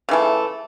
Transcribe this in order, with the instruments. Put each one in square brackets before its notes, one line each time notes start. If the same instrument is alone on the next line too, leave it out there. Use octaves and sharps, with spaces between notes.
[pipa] C#3 E3 A3